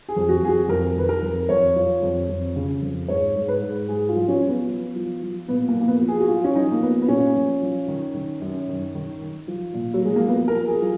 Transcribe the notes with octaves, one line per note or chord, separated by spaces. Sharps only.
G#4
F2
F#4
F2 G#4
F#4
F2 A#4
D#3 B4
A#4
F2
F2 C#5
F3
F2
F2
C#3
F2
G#2 C#5
G#2
B4
G#2
G#2 G#4
F4
F3
C#4
F3
B3
F3
F3
F3
A#2 B3
A#3
F3
A#3
B3
F3
G#4
F#4
F3 F4
C#4
F3 D#4
A#3
F3 B3
B3
A#2 C#4
F3
F3
D#3
D#3
F#2
D#3
D#3
D#3
F3
A#2
F#3
F3 G#3
A#3
F3 B3
A#4
F3
G#4
F3